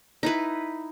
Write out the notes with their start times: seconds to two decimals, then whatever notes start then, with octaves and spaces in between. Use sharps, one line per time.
0.23 D#4 E4 B4